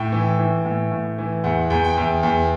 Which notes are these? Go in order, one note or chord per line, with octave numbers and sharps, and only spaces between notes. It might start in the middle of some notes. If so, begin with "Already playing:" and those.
Already playing: A2 G5
E3
E3
A2
A2
E3
E2 F#5
E2
G5
E2
E2